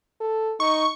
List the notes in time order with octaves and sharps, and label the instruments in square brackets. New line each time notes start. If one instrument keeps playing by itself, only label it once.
[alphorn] A4
[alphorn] D#4 [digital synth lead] C#6